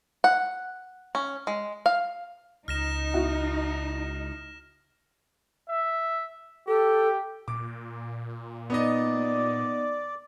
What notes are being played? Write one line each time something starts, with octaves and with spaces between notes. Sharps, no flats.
F#5
C#4
G#3
F5
C#2 D#4 F6 A#6 E7
E4 F#4
E5
G4 A4
A#2 D6
B3 D#4 D5 D#5